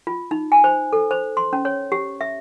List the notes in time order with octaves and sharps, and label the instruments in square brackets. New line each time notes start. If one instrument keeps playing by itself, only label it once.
[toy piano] F4
D#4
G#5
C5
A4
C5
C6
C#4
C#5
G4
E5